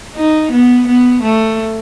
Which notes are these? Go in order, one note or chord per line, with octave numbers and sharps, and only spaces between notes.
D#4
B3
B3
A3